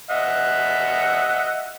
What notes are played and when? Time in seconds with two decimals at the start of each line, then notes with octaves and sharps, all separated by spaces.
0.10 D#5 E5 F#5